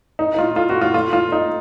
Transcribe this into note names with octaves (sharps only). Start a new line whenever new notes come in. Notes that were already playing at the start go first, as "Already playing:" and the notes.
D#4
D#4
F4
F4
F#4
F4
F4
F4
D#4